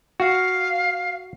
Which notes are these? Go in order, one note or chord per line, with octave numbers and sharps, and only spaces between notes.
F#4 F5